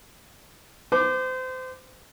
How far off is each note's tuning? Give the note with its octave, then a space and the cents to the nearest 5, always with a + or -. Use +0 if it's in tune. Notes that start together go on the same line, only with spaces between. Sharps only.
C5 -30 D6 +15